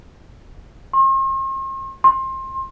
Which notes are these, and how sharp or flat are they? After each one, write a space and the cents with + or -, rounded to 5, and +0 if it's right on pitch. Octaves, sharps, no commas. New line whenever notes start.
C6 +45
C6 +25